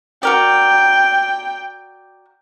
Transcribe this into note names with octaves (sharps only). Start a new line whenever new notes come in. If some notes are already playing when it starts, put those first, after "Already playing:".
F#4 A#4 D5 G5